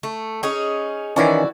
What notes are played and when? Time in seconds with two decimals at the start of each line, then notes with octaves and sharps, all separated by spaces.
0.03 A3
0.43 C#4 D#4 G#4
1.16 D#3 E3 C#4 E4 F#4 D5